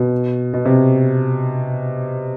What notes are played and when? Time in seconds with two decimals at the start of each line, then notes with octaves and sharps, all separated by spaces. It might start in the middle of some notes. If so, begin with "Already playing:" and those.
Already playing: B2
0.54 B2
0.65 C3